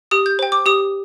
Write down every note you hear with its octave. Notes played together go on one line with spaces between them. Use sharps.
G4 D#6
G6
C5 G5
D6
G4 D#6